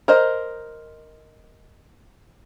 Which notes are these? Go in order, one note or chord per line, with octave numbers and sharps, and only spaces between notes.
A#4 C5 D#5